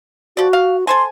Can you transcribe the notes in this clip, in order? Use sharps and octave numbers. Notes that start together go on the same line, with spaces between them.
F3 F#4 D5
F5
A4 C5 G#5 C6